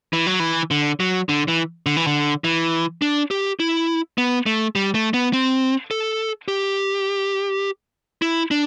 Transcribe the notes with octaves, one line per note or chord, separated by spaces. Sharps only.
E3
F#3
E3
D3
F#3
D3
E3
D3
E3
D3
E3
D4
G4
E4
B3
A3
G3
A3
B3
C4
A4
G4
E4
D4